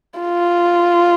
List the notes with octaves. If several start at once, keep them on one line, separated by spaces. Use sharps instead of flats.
F4